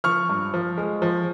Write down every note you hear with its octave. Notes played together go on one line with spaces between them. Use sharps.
F3 C#6 F6
G2
F3
G#3
F3